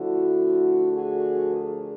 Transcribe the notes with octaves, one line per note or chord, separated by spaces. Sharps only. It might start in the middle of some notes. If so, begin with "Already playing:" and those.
Already playing: D3 F3 A3 D4 E4 F#4
F#4 G#4
G#4 A#4